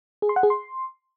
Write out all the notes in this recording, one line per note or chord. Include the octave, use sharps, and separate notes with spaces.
G#4
C6
F#5
G#4
C6